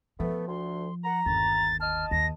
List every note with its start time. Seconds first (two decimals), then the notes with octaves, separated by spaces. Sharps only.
0.20 F3 A3 B3
0.48 D2 C6
1.04 F#5 A#5
1.26 G1 D#2 A6
1.81 D#5 A5 F6
2.11 D#2 A#6